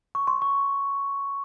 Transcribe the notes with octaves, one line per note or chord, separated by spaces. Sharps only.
C#6
C6
C#6